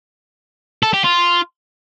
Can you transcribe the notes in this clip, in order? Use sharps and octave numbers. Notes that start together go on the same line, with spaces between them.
A4
G4
F4